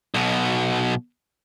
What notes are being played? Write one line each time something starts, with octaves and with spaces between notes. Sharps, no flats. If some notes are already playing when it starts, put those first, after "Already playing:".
B1 B2